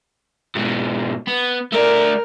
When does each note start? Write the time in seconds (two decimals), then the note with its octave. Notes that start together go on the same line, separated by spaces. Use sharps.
0.55 G#2 B2
1.27 B3
1.72 A3 A#4 D5